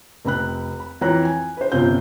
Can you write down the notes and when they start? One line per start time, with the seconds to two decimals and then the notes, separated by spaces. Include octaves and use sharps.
0.25 F1 C4 B5 F#6
0.80 B5
1.01 F2 E3 C#5 A#5 F#6
1.25 G#5
1.57 B4 C5
1.72 G1 C3 C#4 F4 G6